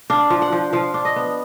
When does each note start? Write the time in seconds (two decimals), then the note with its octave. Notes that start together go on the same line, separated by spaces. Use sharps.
0.10 D4 F5
0.30 F3
0.42 F#5
0.52 F3
0.73 F3 F5
0.94 D4
1.05 D#5
1.16 B3